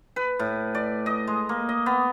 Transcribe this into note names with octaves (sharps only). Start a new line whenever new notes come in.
B4
A2
D5
D#5
G#3
A#3
D#5
B3